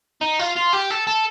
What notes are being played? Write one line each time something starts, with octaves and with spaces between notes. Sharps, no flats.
D#4
F4
F4
G4
A4
A4